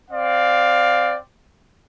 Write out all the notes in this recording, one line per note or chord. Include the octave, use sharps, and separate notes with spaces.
C4 D5 F5